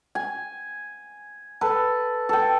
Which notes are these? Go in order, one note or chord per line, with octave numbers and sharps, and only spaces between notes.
G#5
A4 B4
A4 G5